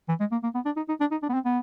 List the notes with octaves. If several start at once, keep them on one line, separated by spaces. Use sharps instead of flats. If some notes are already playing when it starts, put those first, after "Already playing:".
E3
G#3
A#3
A#3
B3
D4
D#4
D#4
D4
D#4
D4
B3
C4
B3